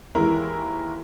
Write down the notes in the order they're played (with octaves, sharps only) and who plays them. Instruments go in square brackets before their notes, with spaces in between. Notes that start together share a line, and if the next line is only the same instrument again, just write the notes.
[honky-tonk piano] D#2 E3 G#3 E4 A#4